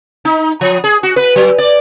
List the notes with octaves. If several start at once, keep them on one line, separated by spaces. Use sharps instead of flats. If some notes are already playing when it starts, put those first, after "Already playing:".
D#4
F3
G#4
F#4
B4
F#3
D5